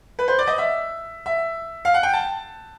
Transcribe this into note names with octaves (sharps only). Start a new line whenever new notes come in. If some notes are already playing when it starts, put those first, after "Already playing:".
B4
C5
D5
D#5
E5
E5
F5
F#5
G5
A5